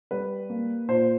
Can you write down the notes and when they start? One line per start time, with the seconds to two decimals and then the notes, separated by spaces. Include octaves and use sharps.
0.11 G3 B4
0.49 A#3
0.88 A#2 C5